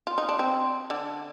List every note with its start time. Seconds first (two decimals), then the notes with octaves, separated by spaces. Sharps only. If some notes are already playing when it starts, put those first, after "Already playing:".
0.07 F4
0.18 D#4
0.29 D4
0.39 C4
0.90 D3 D4